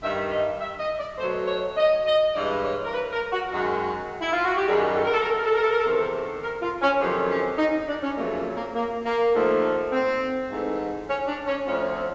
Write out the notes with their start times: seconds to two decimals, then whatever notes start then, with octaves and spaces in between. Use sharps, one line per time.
0.02 G2 D#3 G3 E5
0.32 D#5
0.60 E5
0.80 D#5
0.99 D5
1.18 B2 F#3 A3 C5
1.47 C#5
1.77 D#5
2.06 D#5
2.35 G2 E3 G#3 D5
2.64 C#5
2.85 A#4
2.93 B4
3.13 A#4
3.32 F#4
3.51 F#2 D#3 G#3 F#4
4.21 E4
4.33 F4
4.44 F#4
4.56 G4
4.67 F#2 D#3 G3 G#4
4.97 A4
5.05 A#4
5.14 A4
5.21 A#4
5.30 A4
5.38 A#4
5.46 A4
5.55 A#4
5.62 A4
5.71 A#4
5.79 A4
5.85 E2 C3 D#3 A#4
5.96 A4
6.42 A#4
6.62 F4
6.82 C#4
7.00 F2 C3 D#3 F#3
7.30 C#4
7.58 D#4
7.88 D4
8.03 C#4
8.17 F2 C#3 F#3 A3 A#3
8.37 A#3
8.56 A#3
8.75 A#3
9.04 A#3
9.33 D#2 D3 F3 A3
9.92 C4
10.50 G#2 E3 A3
11.09 C#4
11.27 D4
11.47 C#4
11.66 D2 D3 F3 C#4
11.95 C4